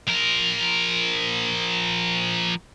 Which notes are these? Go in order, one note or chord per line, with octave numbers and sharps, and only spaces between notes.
F3 A#4